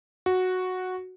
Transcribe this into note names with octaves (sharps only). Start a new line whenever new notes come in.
F#4